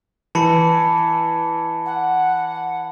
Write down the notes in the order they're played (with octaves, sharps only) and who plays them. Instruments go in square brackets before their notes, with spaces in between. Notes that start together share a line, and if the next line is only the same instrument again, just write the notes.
[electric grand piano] E3 [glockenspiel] A5 B5 C#7
[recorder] F#5